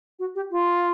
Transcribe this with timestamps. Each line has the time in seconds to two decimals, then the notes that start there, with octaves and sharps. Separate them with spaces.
0.19 F#4
0.35 G4
0.50 F4